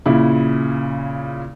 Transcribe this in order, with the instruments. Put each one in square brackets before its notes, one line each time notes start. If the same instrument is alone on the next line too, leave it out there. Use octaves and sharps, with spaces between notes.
[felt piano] A#2 C#3 E4